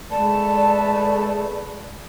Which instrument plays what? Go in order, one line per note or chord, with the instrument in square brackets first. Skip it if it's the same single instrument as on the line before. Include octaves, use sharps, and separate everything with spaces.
[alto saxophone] G#3 [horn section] A3 B4 [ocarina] D5 [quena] A5